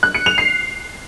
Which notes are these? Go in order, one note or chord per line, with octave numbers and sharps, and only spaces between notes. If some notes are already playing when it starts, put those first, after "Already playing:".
F#6
C#7
F7
C7